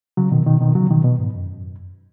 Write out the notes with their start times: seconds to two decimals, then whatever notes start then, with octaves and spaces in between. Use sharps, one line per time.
0.17 C#3 F#3
0.31 B2 D#3
0.46 B2 D#3
0.61 B2 D#3
0.75 C#3 F#3
0.91 B2 D#3
1.04 B2
1.19 G#2
1.34 F#2